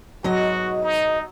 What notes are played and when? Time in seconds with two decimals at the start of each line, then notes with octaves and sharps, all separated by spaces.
0.24 G#2 B2 F#3 F#4 D#5
0.82 D#4